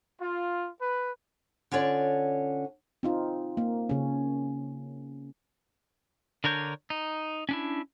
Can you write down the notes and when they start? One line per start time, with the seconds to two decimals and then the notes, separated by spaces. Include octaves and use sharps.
0.20 F4
0.79 B4
1.71 D3 C#4 F4 C#5 D5
3.03 C4 D#4 F4
3.57 A#3
3.89 C#3 C#4
6.44 D3 D4 A#4 C#5 G6
6.90 D#4
7.49 C#4 D4 E4